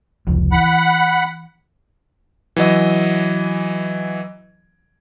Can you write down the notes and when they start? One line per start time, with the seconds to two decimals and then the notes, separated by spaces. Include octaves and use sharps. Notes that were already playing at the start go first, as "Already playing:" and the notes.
0.27 F1 C#2 F3
0.52 E3 F#5 B5
2.56 E3 F#3 D#5